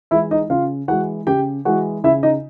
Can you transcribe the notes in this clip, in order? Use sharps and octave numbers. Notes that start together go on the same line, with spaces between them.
E3 G#3 E4 E5
D#4 D#5
C#3 F4 F5
E3 G#3 F#4 F#5
C#3 G4 G5
E3 G#3 F#4 F#5
C#3 E4 E5
D#4 D#5